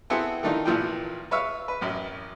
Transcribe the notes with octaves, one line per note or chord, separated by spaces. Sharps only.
B3 C4 E4 F#4 G#4 A4
D#3 E3 A3 D4 D#4 F4
G#1 A#2 E3 F3 B3 G5
B4 C#5 E5 F5
B4
A1 F#2